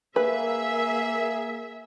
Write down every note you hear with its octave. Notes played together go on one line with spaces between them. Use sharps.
A#3 G#4 B4 E5